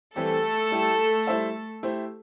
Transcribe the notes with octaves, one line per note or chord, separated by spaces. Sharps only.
E3 G3 A3 C4 G4 A4
G3 E4 G4
G3 E4 C5 E5
A3 E4 G4 C5